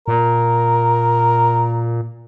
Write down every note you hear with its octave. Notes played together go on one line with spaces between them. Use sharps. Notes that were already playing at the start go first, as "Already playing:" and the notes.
A#2 A#4